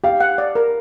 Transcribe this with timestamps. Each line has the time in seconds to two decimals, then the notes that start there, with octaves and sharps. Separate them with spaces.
0.04 G4 F5
0.20 F#5
0.38 D5
0.55 A#4